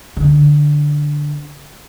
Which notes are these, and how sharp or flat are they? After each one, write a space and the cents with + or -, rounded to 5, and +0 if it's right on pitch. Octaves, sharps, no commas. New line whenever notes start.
D3 +0 D4 +0